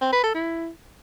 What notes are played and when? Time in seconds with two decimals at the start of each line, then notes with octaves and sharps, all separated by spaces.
0.01 C4
0.12 B4
0.23 A4
0.34 E4